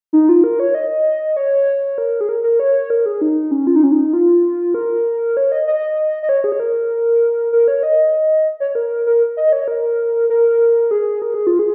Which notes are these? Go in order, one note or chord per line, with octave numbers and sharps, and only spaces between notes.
D#4
F4
A#4
C#5
D#5
C#5
A#4
G#4
A#4
A#4
C#5
A#4
G#4
D#4
C#4
F4
D#4
C#4
D#4
F4
A#4
C#5
D#5
D#5
D#5
C#5
G#4
C#5
A#4
A#4
C#5
D#5
C#5
A#4
A#4
D#5
C#5
A#4
A#4
G#4
A#4
G#4
F4
G#4